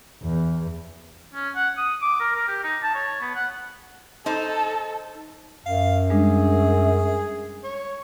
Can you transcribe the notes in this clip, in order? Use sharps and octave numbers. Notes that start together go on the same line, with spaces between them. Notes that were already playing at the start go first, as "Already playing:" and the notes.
E2
C#4
F#5
D#6
D6
A#4
A#4
G4
D#4
A5
C#5
B3
F#5
D#4 A4 C5
F#2 F5
G3 G#3 D4 G#4
C#5